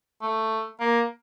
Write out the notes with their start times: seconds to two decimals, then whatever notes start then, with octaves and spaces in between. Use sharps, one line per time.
0.21 A3
0.80 A#3